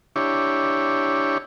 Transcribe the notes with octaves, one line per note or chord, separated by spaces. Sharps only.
D4 E4 G4 C#5